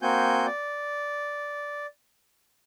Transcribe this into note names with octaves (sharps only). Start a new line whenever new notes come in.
A#3 C4 F#4 G#5 G6
D5